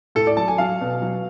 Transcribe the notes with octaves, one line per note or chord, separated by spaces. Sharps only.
A2 A4
D5
F#3 A5
G#5
F#3 F5
B2
F#3